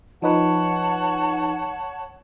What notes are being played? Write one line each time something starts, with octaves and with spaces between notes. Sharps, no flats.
F3 D#4 B4 C#5 F#5 A5